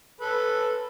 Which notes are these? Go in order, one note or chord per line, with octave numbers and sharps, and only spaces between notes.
A4 B4